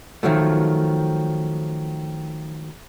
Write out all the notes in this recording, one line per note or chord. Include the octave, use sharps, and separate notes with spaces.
D#3 F3 F#3 A3